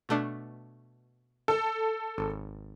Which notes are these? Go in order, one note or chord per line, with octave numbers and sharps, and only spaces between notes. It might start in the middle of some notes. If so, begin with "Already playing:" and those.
B2 A3 D4
A4
G#1